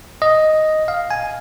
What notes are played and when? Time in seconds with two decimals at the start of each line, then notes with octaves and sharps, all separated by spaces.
0.22 D#5
0.88 F5
1.11 G#5